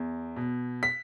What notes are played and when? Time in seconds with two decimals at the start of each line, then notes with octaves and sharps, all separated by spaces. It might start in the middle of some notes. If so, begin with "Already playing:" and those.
Already playing: E2
0.36 B2
0.83 B6